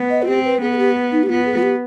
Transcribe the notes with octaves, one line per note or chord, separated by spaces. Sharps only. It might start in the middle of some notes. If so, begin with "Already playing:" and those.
Already playing: B3
D#5
F4
C4 G4
B4
B3 G#4
G#4
G4
D#4
G4
B3 F4
G#4
F4
G4